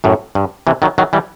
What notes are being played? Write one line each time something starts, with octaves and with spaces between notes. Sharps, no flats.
F#2 A2
G2
C3 E3
D#3 F#3
D#3 F#3
E3 G3